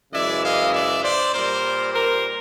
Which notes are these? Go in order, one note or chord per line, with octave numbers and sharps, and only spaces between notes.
F#2 C#3 E3 G#3 D5 E5
D#5 F5
D5 E5
C5 D5
A#2 G3 A#4 C5
A#4 C5